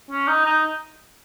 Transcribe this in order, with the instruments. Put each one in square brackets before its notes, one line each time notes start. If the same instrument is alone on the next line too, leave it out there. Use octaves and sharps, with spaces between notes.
[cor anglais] C#4
D#4
D#4